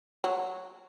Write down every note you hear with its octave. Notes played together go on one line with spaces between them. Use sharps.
F#3